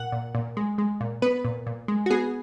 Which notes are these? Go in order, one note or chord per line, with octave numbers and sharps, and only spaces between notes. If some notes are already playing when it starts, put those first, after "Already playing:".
Already playing: A#2 F#5
A#2
A#2
G#3
G#3
A#2
B3 B4
A#2
A#2
G#3
F#4
B3 G#4